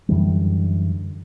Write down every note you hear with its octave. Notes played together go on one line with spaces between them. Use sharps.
F#2 D3 E3 G3